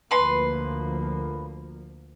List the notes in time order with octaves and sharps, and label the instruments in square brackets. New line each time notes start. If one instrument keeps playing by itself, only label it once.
[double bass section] D2 F3 A#3 [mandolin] B4 C6